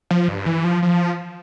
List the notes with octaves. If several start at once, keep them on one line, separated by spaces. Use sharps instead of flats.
F3
G2
E3
F3
F3